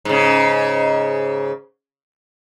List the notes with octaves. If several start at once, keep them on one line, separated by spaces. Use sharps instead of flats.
G#2 C#3